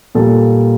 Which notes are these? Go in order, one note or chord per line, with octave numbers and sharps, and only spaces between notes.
A#2 G3 A#3 A4